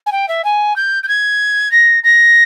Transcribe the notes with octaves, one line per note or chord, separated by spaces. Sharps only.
G#5
G5
E5
G#5
G6
G6
G#6
A#6
A#6